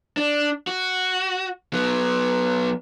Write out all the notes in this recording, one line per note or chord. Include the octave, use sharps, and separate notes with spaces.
D4
F#4
F#3 B3